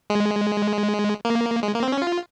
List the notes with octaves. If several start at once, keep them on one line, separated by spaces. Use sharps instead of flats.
G#3
A#3
G#3
A#3
C4
C#4
F4